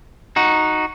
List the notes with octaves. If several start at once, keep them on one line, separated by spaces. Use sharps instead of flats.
D#4 F#4